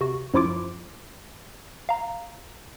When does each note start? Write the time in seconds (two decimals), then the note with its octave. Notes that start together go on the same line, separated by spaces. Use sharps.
0.01 C3 F#4
0.34 F#2 F3 E4 F4 D6 D7
1.89 F5 A#5